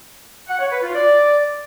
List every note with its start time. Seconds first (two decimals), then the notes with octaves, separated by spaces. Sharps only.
0.48 F#5
0.60 C#5
0.71 B4
0.82 F4
0.94 D5